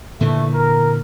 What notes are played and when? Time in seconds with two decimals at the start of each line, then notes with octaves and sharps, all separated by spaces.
0.21 A#2 D3 E3 A3
0.53 A#4